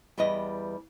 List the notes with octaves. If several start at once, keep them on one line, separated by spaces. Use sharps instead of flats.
E2 G3 E4 B4 D#5